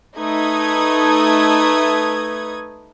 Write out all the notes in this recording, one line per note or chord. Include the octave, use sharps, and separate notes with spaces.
A3 D#4 B4 D#6 G#6